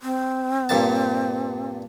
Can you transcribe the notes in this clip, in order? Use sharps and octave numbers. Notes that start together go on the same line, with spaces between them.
C4
G2 A#2 A5